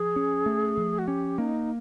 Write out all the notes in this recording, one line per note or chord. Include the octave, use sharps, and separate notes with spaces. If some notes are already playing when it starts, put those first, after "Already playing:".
Already playing: F3 G#4
C#4
A3
F3
F#4
C#4 G4
A#3 D#4